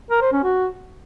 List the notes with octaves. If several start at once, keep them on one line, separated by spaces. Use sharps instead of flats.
A#4
C5
C#4
F#4